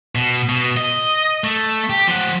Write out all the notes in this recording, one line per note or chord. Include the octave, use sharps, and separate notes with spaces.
B2
B2
D#5
A3
G4
F3 F#5